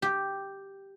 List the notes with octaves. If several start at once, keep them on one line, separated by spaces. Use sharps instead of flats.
G4